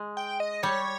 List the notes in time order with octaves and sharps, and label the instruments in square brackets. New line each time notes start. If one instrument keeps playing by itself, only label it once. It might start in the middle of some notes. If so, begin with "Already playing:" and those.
Already playing: [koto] G#3
[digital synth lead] G5
D#5
[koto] G3 [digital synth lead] C#5